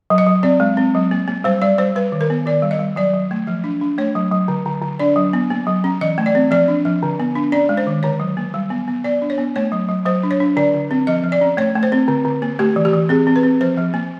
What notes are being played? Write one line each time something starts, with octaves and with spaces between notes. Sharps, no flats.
F#3
D#5
F#3
C4 D5
G#3
C4
F#3
A#3
A#3
G3 C5
G3 D5
G3 C5
G3 B4
D#3
A#4
B3
D#3 D5
G3
D#5
G3
F#3 D5
F#3
A3
F3
D4
D4
A3 C#5
F#3
F#3
D3
D3
D3
D4 D5
F#3
B3
A#3
F#3
C#4
E3 D#5
A3
D5
C4
F3 D5
D4
F3
D3
B3
D4
C#4 D5
G#3
C5
D#3
D3 C#5
F#3
A#3
G3
B3
B3
B3 D5
D4
C#5
B3
A3 C#5
F#3
F#3
F#3 C5
D4
C#5
D4
D3 D5
D3
C4
F3 D#5
F3
D5
C#4
A3 C#5
A3
C5
C4
D3
D3
A#3
A3 G4
E3
G4
E3
C4 G#4
C4
B4
C4
F3 C5
F3
A#3